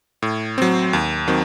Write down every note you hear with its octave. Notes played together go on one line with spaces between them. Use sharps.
A2
F#3 C4
D#2
D#3 F#3 C4